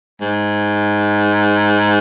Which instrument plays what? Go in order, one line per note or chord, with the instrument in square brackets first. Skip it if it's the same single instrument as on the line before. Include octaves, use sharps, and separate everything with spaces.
[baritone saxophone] G#2